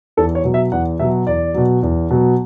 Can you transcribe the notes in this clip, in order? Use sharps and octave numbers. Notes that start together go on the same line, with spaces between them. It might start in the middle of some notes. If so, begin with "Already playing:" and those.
E2 A4
C#5
B2 F#3
E5
E2 F#5
B2 F#3 E5
E2 D5
B2 F#3
E2
B2 F#3